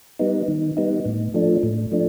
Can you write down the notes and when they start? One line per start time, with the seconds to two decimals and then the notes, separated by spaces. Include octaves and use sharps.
0.19 G3 B3 D#4
0.48 D#3
0.77 G3 B3 D#4
1.05 A2
1.34 F3 A3 D4
1.63 A2
1.92 F3 A3 D4